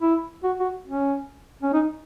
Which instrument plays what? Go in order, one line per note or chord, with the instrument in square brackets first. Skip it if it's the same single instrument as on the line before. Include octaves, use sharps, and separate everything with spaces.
[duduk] E4
F#4
F#4
C#4
C#4
D#4